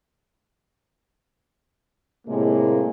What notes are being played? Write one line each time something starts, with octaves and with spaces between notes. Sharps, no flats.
A2 C3 G#3 A#3